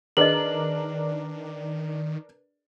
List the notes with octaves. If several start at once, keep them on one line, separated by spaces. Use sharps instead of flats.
D#3 D4 G#4 A#4 B4 D#5 F#7